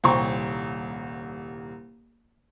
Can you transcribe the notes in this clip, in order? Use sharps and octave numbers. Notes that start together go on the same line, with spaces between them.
D#1 C2 C5 G5 A#5 C#6